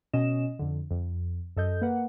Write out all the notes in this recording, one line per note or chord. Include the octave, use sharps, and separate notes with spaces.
B2 C#4 D#5 E7
F2 D3
F2
F#2 A4 D#5 G6
A#3 B4 F#5